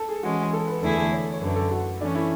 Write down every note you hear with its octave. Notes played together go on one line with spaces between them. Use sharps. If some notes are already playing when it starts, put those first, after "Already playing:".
Already playing: A4
G#4
E3 G#3 C#4 F#4
A4
B4
E2 D3 A3 E4 G#4 A4
A4
C#5
C#5
F#2 D3 A3 B4
A4
F#4
E3 A3 C#4 D4
E4